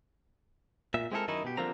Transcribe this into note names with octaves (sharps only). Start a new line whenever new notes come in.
A#2 E5
G#3 C4 E4 G4 A4 A#4
F#2 D#3 D#4 E4
B2 G4
D3 F3 G3 A#3 C4 A#5